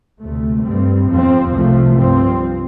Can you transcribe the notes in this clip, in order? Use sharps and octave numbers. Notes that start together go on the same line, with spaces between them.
D2 C3 A3
G2 G3 C4
F2 F3 C4
C2 C3 F3 A3
G2 F3 C4